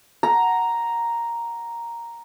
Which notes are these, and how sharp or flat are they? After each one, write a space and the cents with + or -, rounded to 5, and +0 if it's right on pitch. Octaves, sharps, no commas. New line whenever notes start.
F#5 +0 A#5 +0